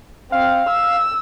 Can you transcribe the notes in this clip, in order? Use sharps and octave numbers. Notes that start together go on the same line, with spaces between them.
C4 F5
E6